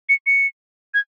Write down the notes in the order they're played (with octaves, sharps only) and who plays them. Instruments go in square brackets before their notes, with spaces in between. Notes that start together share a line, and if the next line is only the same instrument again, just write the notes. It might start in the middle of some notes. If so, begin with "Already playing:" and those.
[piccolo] C#7
C#7
G#6